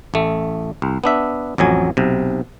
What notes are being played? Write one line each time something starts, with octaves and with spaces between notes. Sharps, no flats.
A1 A3
C2
B3 D4 E5
A1 F2 F#3 G#5
B1 C3